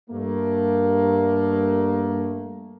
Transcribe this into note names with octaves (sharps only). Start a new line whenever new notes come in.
G2 A3 A#3